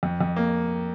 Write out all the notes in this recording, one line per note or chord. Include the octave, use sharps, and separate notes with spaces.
F2
F2
A#3